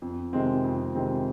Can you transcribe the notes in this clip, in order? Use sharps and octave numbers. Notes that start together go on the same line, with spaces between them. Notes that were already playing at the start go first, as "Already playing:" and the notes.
F2
C3 D#3 G#3 C4
F2
C3 D#3 G#3 C4